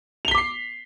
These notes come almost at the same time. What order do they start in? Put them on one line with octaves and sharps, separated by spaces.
F7 G7 B6 D6 C7